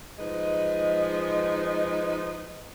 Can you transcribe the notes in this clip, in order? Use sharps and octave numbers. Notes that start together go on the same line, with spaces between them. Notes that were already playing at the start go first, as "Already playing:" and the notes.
F3 G#3 D#4 B4 D#5